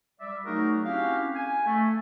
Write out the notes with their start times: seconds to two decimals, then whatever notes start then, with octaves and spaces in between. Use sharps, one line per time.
0.20 G3 D5 E5
0.45 F#3 A3 D#4 F#4 G#4 A#4
0.85 C4 C#4 E4 F#4 G4 F5
1.35 G#5
1.66 A3